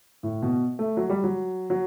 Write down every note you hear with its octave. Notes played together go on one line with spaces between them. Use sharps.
A2
B2
A3
F#3
G3
F#3
F#3